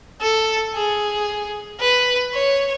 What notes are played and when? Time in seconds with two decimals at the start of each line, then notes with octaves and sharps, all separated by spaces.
0.21 A4
0.74 G#4
1.80 B4
2.34 C#5